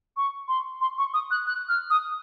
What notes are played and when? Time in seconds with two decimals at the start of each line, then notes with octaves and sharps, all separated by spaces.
0.17 C#6
0.48 C6
0.81 C6
0.98 C#6
1.14 D#6
1.31 F#6
1.47 F#6
1.69 F6
1.90 D#6